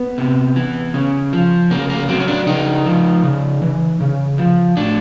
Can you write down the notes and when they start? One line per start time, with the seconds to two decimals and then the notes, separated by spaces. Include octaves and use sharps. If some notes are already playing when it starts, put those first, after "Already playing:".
Already playing: B3
0.18 C3
0.56 E3
0.94 C#3
1.33 F3
1.71 C#3 A#3
1.90 A#3
2.09 F#3 C4
2.20 C#4
2.28 D4
2.47 C#3 D#4
2.86 F3
3.24 C#3
3.62 E3
4.01 C#3
4.38 F3
4.77 A2 D4